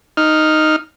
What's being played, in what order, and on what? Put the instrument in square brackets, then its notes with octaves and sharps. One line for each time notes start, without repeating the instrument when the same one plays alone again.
[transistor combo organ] D#4 F6